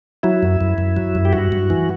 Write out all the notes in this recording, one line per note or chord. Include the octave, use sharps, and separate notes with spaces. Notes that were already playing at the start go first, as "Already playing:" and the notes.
F#3 E4
F#2
F#2
F#2
F#3
F#2
G4
G2 F#4
G2
E3